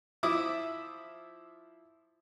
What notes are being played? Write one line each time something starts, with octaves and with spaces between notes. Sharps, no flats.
F3 E4 E5 D6 D#6